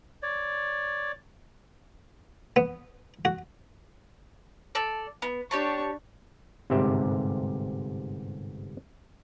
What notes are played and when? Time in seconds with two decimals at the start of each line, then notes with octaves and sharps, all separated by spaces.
0.22 C#5 D5
2.56 B3
3.25 F#4
4.75 A4 D5
5.22 B3
5.51 D4 G4 C#5 A5 C#6
6.70 G1 G#2 C3 C4 G4 E5